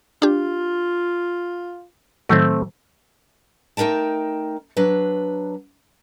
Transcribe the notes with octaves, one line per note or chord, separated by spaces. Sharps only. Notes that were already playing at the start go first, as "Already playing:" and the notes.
D4 F4 G4
A2 D#3 F#3 A3 C4
A3 D#4 A#4 G5 A5
F#3 D4 B4